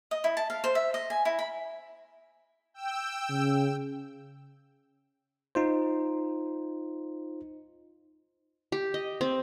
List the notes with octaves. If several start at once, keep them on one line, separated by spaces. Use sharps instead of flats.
D#5
E4
A5
F5
C5
E5
D#5
G#5
E4
B5
G5 E6
C#3
D#4 F4 C5
G4
D#5
C4